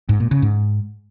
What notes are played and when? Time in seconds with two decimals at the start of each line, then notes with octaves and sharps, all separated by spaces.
0.09 G#2
0.20 A#2
0.31 C#3
0.42 G#2